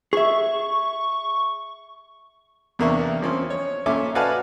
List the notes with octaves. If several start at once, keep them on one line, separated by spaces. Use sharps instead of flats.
G#4 E5 C#6
E2 C3 A#3 D4 E5 C#6
F3 C4 C#4
C#5
A#2 A3 C#4 E5 D6
F#4 B4 D5 F5 G#5 A5